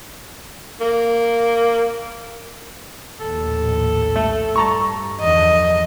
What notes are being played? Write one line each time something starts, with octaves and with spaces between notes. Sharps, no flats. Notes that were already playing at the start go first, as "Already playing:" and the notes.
A#3
A#1 D#2 A2 A4
A3
G2 A5 A#5 C#6
E2 D3 F3 D#5